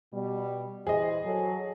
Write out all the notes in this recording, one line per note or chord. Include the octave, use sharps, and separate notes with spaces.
B2 G3
E3 G#4 C5 D#5
F#3 A4